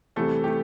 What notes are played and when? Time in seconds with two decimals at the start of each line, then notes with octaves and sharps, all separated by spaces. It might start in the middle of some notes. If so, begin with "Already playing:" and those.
0.16 E2 C3 E3 G3 A3 A4
0.44 G4
0.48 A3